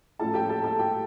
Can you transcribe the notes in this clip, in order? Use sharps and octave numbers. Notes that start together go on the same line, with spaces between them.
A2 F3 C#4 E4 A4 A5
G4 G5
A4 A5
A4 A5
G4 G5